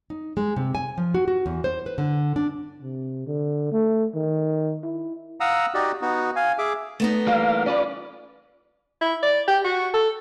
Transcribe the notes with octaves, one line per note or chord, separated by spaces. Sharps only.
D#4
G#3
C3
G#5
F3
F#4
F#4
E2
C5
B4
D3
D4
C3
D3
A3
D#3
E4
F5 F#5 A#5 D#6 E6
D#4 F#4 G4 D5 D#5
B3 D#4 F#4
F5 G#5
G#4 E5 D6
A3 B3 D#4
E3 G3 A#3 F5
C#4 F4 B4 D5
E4
D5
G4
F#4
A4